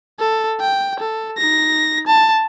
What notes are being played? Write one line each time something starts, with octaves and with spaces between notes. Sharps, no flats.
A4
G5
A4
D#4 A#6
A5